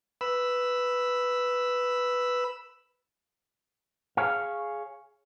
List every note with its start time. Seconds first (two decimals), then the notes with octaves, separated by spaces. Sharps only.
0.21 B4 B5 E6
4.17 G#4 C#5 F5